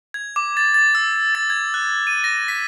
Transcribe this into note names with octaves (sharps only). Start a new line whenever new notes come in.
G#6
D6
A6
A6
E6
A6
G#6
F#6
D#7
A#6
B6